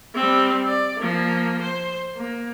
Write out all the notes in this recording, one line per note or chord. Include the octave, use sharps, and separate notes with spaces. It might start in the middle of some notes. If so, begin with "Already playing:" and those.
G3 C4
D5
F3 A#3
C5
A#3